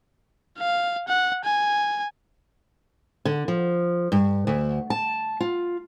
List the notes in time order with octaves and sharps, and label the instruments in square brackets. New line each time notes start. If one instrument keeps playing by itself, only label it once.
[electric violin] F5
F#5
G#5
[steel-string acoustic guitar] D3
F3
G2
D2
A5
F4